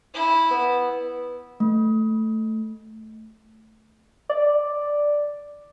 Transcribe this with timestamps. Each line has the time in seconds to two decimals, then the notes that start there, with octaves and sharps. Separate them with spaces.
0.13 E4
0.51 B3
1.60 A3
4.30 D5